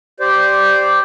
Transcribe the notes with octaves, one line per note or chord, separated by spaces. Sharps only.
G4 C5 D5